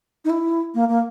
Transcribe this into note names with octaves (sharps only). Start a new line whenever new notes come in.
D#4
E4
A#3
A#3